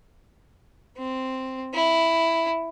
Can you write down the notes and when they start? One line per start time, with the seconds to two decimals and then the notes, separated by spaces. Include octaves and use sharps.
0.98 C4
1.74 E4